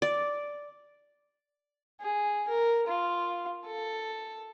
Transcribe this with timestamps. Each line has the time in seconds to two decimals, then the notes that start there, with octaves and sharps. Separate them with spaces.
0.02 D5
2.01 G#4
2.48 A#4
2.87 F4
3.66 A4